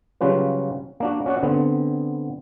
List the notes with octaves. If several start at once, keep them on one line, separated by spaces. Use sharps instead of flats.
C#3 F#3 G3 C#4 F4 B4
A#3 D4 F#4
C#4 F#4 D5 F#5
D3 B3 C4